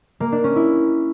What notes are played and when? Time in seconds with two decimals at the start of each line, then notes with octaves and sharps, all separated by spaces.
0.20 A#3
0.32 D4
0.44 C#4
0.56 E4